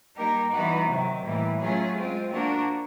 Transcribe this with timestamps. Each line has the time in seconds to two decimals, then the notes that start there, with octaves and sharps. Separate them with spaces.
0.16 G3 A#3 D#4 G4 A#4
0.51 E3 G3 B3 D#4 F#4
0.88 C3 D#3 F#3
1.23 A2 E3 G3 A#3
1.58 F#3 A3 C#4 F4 G#4
1.94 G#3 C4 F4
2.31 F3 A#3 D4 F#4 A#4